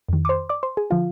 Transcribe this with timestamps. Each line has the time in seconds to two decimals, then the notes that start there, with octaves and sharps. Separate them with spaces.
0.09 F2 D#3
0.25 D6
0.29 C5 C6
0.49 D5 D6
0.63 C5 C6
0.77 G#4 G#5
0.90 D3 F3 F4 F5